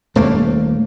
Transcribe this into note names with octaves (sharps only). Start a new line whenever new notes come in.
D#1 A3 A#3